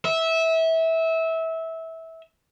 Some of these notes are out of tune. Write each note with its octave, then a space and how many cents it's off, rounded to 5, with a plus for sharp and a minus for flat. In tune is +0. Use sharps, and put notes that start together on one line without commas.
E5 -20